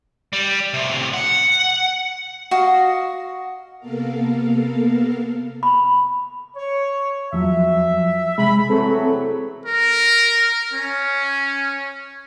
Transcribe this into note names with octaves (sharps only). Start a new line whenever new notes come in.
G3
A2 C3
F#5
F#4 D#5 F5
C3 A#3 B3 A4 A#4 F5
B5
C#5
E2 F3 F#3 E5
C3 G#3 B5
E3 F#3 A3 C4 G#4 A4
A#4
C#4